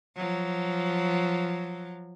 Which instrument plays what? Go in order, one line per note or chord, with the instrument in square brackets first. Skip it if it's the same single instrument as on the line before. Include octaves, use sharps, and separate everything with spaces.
[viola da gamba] F3 F#3